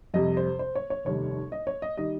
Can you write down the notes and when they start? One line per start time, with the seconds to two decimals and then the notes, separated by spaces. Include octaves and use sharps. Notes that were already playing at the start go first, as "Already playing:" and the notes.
0.14 F2 C3 G3 D#5
0.37 C5
0.59 C5
0.75 C#5
0.90 C#5
1.05 F1 D#2 D#3 G3 C#5
1.52 D#5
1.67 C#5
1.82 D#5
1.97 D#3 G3 D#5